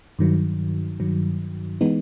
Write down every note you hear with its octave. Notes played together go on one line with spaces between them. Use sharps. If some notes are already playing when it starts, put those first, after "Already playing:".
G2 D#3 F#3
G2 D#3 F#3
E3 G#3 B3 D#4